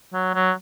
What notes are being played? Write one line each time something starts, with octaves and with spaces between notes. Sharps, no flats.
F#3
F#3